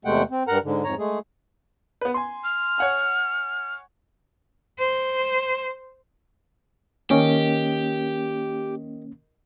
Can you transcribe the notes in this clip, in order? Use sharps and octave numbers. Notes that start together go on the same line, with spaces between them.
E2 C3 G#3 A3 F#5 G5
C4
G2 A#4 F#5 A#5
G#2 D3
F2 G#2 C#5 A#5
G#3 A3 G#4
B3 B4
G#5 C6
F6
C#5 F#5 G#5
C5
D#3 A#3 C#4 G4